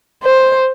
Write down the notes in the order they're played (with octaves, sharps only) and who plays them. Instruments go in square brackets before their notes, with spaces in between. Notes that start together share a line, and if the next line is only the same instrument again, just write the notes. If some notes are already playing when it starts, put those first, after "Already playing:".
[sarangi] C5